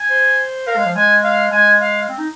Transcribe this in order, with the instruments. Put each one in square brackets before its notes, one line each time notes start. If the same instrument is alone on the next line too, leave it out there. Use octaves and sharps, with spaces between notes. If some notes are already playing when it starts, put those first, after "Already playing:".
Already playing: [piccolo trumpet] G#5
[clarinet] C5
[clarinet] A#4 [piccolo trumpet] F5
[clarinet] G#3
F3
[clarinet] G#3 [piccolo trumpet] G#5
[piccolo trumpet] F5
[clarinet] G#3 [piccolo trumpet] G#5
[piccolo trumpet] F5
[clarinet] C4
D#4